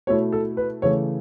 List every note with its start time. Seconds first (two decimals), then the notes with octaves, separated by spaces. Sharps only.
0.07 B2 A3 E4 C#5
0.32 A4
0.57 B4
0.82 C#3 E3 A3 C#5